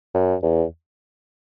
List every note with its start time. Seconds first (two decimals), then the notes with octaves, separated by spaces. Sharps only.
0.14 F#2
0.43 E2